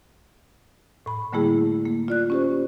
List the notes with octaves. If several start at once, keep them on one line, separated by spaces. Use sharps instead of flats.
A2 B5
D3 G3 A3 A#3 E4 G#4
A#3
F4 D5 F#6
C#4 G4 C5